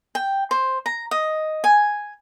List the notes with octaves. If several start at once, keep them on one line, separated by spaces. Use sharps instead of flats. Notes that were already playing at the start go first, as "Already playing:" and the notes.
G5
C5
A#5
D#5
G#5